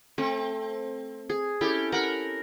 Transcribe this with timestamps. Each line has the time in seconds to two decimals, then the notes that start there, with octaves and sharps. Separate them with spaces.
0.18 A3 C4
1.30 G#4
1.61 C#4 E4 G4 A4
1.92 A#4 F#5 B5